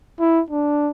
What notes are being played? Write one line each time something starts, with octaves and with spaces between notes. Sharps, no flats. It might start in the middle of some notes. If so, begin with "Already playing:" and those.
E4
D4